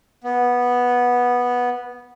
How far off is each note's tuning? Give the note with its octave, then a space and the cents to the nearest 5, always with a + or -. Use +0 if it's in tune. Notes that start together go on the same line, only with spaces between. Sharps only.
B3 -10